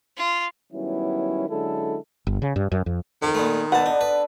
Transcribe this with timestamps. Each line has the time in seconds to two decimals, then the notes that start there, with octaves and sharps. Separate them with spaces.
0.17 F4
0.73 D#3 F#3 G3 B3 C#4 E4
1.49 D3 F#3 G#3 C#4 E4 A4
2.27 G1
2.42 C#3
2.56 G2
2.72 F#2
2.86 F2
3.23 F2 D#3
3.35 A#2 G#3 A3 B3
3.72 B2 A4 B4 D5 F#5 A5
3.86 D3 D4 D#4
4.01 B4